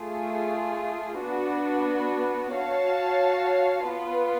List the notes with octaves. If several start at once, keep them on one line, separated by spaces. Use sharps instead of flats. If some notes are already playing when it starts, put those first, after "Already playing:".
Already playing: A3 F4 G#4
B3 D4 F#4
F#4 C#5 F5 A5
B3 F4 B4